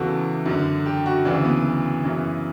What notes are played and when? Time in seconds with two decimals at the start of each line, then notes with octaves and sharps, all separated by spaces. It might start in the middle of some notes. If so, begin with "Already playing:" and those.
Already playing: E2 C#3 E3 F#4 A4
0.46 F#2 D3
0.86 G4
1.06 F#4
1.25 D2 C#3 E3 D4
1.44 B3
2.04 F#2 C#3 E3